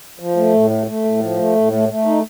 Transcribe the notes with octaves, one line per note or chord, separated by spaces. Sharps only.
F3
A3
A2
A3
A3
A2
F3
A3
A2
A3
A3
D#4